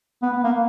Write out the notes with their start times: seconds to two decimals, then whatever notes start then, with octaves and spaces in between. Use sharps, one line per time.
0.22 B3
0.33 B3
0.44 A#3